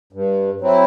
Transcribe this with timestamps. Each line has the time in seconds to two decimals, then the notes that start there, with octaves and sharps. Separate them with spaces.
0.13 G2
0.60 F#3 C4 E4